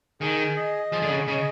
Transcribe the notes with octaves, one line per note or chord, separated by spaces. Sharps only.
D#3 G#4
D#5
F3 G#4
D3
C#3
C#3 D#5